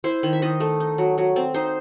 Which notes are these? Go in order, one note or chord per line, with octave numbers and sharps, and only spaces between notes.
E4 C5
D#3
E5
D#3 D#5
A3
D#4
F#3
F#3
C4
D#4 C5